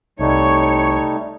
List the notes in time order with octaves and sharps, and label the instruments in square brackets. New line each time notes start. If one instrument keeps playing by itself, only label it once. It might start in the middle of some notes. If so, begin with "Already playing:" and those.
[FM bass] C2 [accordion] G3 A3 D#4 [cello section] C#5